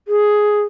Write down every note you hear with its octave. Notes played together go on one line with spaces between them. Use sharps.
G#4